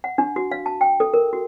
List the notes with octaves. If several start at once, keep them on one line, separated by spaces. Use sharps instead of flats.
F#5
D4
F#4
F5
A5
G5
A4
A#4
F#4